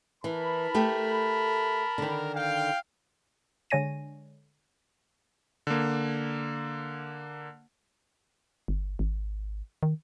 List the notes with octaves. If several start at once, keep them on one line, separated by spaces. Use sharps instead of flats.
E3 A#4 A5 B5
A3 G4 A4
D3 D#3
F5 G5
D3 G#3 C#5 G#5 A#6 D#7
D3 A#3
G1
G#1
D#3